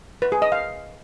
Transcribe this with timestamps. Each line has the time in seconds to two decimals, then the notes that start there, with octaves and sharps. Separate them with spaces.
0.22 B4
0.32 G#4
0.42 D#5
0.52 F5